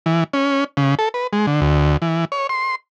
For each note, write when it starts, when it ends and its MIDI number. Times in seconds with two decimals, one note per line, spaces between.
0.06 0.24 52
0.33 0.64 61
0.77 0.95 49
0.99 1.09 69
1.14 1.27 71
1.33 1.46 56
1.47 1.61 50
1.61 1.97 38
2.02 2.25 52
2.32 2.47 73
2.49 2.75 84